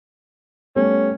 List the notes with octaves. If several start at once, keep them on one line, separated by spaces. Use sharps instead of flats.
G3 A3 B3 C#4